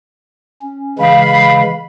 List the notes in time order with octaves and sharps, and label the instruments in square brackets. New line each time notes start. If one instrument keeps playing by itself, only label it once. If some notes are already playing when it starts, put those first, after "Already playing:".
[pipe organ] C#4
[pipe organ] C#3 E3 G#3 [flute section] F5 B5